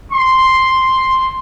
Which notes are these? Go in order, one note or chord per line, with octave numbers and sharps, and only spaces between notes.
C6